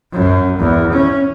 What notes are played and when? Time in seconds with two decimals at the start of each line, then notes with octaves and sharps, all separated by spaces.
0.13 F#2
0.59 E2
0.93 C#4